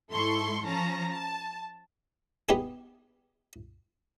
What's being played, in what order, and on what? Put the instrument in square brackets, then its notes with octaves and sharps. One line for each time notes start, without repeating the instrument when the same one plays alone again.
[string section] G#2 E4 A4 C6 C#6
F3 C#4 A5 A#5
A5
[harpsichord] B3 D#4 G4 G#4